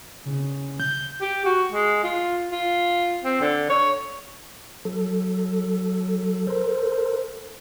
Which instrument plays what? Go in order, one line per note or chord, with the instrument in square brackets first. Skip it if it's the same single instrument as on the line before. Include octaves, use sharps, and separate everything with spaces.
[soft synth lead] C#3
G6
[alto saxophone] G4
F#4
G#3
F4
F4
C4
D3
C#5
[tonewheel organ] F#3 A4
A4 A#4 C5